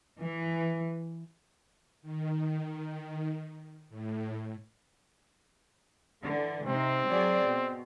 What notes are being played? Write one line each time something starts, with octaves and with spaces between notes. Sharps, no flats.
E3
D#3
A2
D3 E3
C3 C4 D#4
F#3 G#4 D5
B2